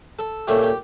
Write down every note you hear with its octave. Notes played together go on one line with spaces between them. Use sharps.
A4
A#2 A3 C#4 G4
G4